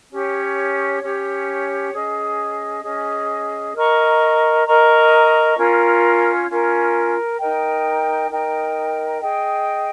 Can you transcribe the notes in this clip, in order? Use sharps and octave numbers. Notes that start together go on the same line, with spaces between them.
C#4 G4 C#5
C#4 G4 C#5
C#4 G#4 D#5
C#4 G#4 D#5
A#4 D#5 A#5 C#6
A#4 D#5 A#5 C#6
C#4 F4 A#4
C#4 F4 A#4
D#4 A#4 D#5 G5
D#4 A#4 D#5 G5
G#4 D#5 G5